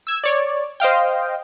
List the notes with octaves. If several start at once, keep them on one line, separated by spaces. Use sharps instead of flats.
E6 G#6
C#5 D5
C5 D#5 F5 G5